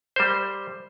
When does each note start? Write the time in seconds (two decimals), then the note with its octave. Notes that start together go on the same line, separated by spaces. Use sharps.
0.16 G3 A#4 C5